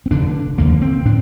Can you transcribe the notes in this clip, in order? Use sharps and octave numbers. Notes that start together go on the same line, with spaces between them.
C4
F1 D#2 D3 D4
F1 D#2 D3 A#3
C4
A2 D4